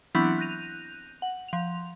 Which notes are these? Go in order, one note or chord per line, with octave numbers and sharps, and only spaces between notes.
E3 F#3 B3 C4 D4 E4
F#6 G6 A#6 D#7 F7
F#5
F3 F7